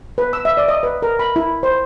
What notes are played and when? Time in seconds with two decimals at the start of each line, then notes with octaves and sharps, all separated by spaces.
0.18 B4
0.33 E6
0.45 E5
0.57 D5
0.68 D#5
0.83 B4
1.02 A#4
1.19 B5
1.36 E4
1.63 C5